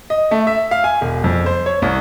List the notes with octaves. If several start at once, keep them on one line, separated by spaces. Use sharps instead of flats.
D#5
A3
E5
F5
G#5
E1
F2
C5
C#5
C2